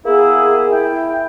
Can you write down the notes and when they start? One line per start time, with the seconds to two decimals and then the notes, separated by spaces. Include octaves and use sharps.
0.06 A#3 B3 E4 G#4
0.71 E4 G5